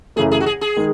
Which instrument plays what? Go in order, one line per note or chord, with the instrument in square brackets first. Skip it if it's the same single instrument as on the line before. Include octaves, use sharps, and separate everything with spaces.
[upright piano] F#2 C#3 E3 A3 [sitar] G#4
[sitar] G#4
F#4
G#4
G#4
[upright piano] D#3 G#3